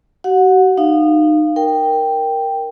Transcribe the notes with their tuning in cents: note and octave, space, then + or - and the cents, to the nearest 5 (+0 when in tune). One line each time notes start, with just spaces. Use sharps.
F#4 +45 F#5 -20
D#4 -25 F5 -10
A#4 +0 G5 +0